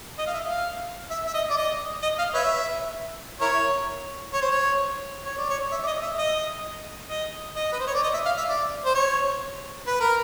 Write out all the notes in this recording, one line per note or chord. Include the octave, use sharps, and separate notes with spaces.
D#5
F5
E5
F5
E5
E5
D#5
D5
D#5
D#5
F5
B4 C#5 E5
E4 A#4 C#5
C#5
C5
C#5
C#5
D5
C#5
E5
D5
D#5
E5
D#5
D#5
D#5
B4
C5
C#5
D5
D#5
E5
F5
E5
D5
C5
C#5
B4
A#4